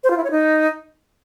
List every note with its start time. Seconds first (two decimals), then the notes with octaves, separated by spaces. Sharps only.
0.04 C5
0.10 F4
0.17 E4
0.24 C#5
0.31 D#4